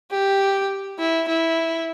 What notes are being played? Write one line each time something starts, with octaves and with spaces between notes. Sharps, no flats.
G4
E4
E4